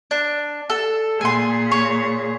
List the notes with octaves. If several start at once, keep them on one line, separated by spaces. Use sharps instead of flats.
D4
A4
A#2 G#4 G#5 C6
C#5